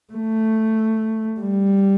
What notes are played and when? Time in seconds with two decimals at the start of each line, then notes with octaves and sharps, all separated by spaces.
0.13 A3
1.40 G3